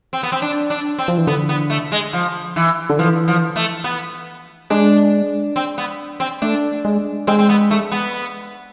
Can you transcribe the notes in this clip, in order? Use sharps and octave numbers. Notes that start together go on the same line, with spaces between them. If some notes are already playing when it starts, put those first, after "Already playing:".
C4
B3
C4
D4
D4
C4
F3
E3
D3 B3
B3
A3
G#3
F3
E3
D3
E3 F3
F3
A3
B3
G#3 D4
C4
B3
C4
A3 D4
G#3
G#3 C4
C4
B3
A3
B3